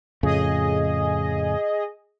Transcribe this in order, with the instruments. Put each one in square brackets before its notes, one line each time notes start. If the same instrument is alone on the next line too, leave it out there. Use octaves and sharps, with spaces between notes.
[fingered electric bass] F2 A2 C#3 [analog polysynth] G#4 D#5